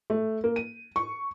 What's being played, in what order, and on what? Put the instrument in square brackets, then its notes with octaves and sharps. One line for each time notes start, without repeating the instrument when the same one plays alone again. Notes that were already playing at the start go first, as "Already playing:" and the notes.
[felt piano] A3
A#3
D#7
C#6